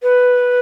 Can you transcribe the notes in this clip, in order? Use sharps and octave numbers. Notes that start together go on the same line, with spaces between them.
B4